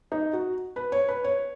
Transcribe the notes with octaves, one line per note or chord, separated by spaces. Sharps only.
D#4
F#4
B4
C#5
B4
C#5